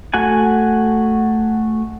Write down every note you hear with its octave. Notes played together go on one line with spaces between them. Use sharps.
A3 F#4 F#5 G#5